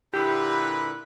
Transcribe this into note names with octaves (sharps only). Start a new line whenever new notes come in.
A#2 D3 E4 G4 B4